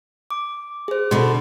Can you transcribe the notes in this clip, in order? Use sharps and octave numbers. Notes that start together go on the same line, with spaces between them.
D6
G#4 C5
B2 D3 D#4 B5 C6